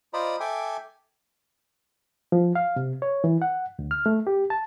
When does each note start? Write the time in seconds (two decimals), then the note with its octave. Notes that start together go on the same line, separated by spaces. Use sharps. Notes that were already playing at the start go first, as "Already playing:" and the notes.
0.13 F4 C5 D5 D#5 A#5 B5
0.40 A4 E5 G5 G#5 D6
2.32 F3
2.55 F5
2.76 C3
3.02 C#5
3.24 E3
3.42 F#5
3.79 D2
3.91 F6
4.06 A3
4.27 G4
4.50 A5